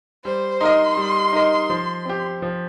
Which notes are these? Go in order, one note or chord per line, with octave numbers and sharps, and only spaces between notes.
G3 C5
D#4 A#4 D#5 C6
G3
D#4 A#4 D#5
F3
C4 G4
F3